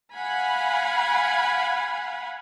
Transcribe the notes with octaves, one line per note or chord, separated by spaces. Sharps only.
F5 F#5 G#5 B5